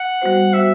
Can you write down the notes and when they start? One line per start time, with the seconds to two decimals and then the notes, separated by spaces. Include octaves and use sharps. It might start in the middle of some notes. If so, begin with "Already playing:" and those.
Already playing: F#5
0.22 G3 B3 F#4 C5
0.53 G3 B3 F#4 C5 E5